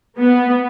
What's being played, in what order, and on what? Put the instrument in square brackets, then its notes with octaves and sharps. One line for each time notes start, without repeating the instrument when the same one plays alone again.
[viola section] B3